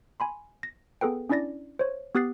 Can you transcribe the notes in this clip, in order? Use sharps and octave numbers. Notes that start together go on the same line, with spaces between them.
G#5 B5 C6
A#6
B3 G#4 A4 B4 G5
C#4 D4 E4 D5 A6 A#6
C5 C#5
B3 G4 D#6 F#6 A6 C7